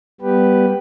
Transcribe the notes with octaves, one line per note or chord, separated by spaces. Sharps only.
G3 B3 G4 B4